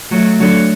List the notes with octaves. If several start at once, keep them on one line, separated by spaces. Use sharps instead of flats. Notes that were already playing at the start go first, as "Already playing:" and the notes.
F#3 A3
D3 F#3